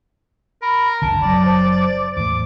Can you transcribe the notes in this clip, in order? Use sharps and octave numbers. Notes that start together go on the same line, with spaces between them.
A#4 B5
F#1 C2 D3 A5
F#1 F#3 D5
C5
E2 A2 D6